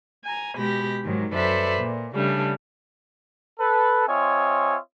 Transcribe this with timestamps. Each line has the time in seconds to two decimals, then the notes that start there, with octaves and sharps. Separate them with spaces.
0.25 G#5 A#5
0.56 B2 G#3 G4 B5 A#6
1.04 G#2 D#3 F#3
1.34 F#2 A4 B4 C5 D5 E5
1.79 A#2
2.15 C#3 G3 A3 D4
3.59 A4 B4
4.07 C4 F4 C#5 D#5 E5 G#5